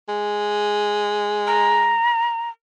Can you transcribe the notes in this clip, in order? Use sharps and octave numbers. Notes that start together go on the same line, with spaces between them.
G#3
A#5